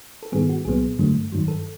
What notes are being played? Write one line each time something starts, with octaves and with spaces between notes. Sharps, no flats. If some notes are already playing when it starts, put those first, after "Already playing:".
A4
G#2 D#3 G3 B3 G#4
F#4
C2 A#2 F#3 B3 G#4
G2 D3 F#3 A3
G2 D#3 F#3
A4